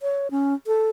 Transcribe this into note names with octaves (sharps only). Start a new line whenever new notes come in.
C#5
C#4
A4